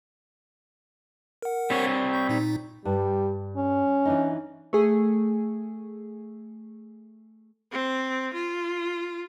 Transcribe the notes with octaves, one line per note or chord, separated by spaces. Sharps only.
A#4 F#5
G3 C4 C#5
C#6 G6
A#2 D#4
G2 G3
C#4
E3 D4 D#4
A3 G#4
C4
F4